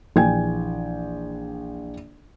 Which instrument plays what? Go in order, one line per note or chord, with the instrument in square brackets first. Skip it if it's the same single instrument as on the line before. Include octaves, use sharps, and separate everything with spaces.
[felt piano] A#1 E3 G5 G#5 G#6